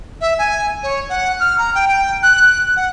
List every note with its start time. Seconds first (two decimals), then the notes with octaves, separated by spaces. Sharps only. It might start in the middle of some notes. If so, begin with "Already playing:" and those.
0.21 E5
0.39 G#5
0.83 C#5
1.10 F#5
1.40 F6
1.58 A#5
1.75 G5
1.89 G5
2.23 F#6
2.76 F#5